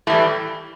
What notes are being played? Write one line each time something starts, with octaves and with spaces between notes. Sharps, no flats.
A2 E3 G3 A3